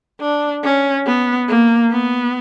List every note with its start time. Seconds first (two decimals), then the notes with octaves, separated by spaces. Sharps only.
0.21 D4
0.64 C#4
1.06 B3
1.48 A#3
1.91 B3